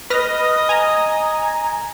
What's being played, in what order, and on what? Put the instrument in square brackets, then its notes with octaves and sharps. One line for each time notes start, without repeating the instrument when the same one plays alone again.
[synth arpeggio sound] B4 F6 A#6 [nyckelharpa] D#5 D#6
[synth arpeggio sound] G#5 A#5